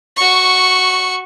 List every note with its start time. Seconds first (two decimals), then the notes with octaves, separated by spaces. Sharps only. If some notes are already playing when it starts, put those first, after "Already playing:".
0.17 F#4 C#6